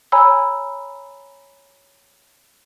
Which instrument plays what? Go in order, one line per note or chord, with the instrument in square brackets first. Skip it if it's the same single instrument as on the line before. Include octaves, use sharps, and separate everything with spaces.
[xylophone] C#5 G#5 A#5 B5 E6